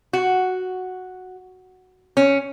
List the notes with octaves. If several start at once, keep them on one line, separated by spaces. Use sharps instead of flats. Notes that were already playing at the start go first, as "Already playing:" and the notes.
F#4
C#4